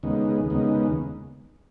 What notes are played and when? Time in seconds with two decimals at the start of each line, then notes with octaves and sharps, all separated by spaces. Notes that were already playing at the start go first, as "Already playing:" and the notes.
0.03 D#2 C#3 G#3 B3 D#4
0.50 D#2 C#3 G#3 B3 D#4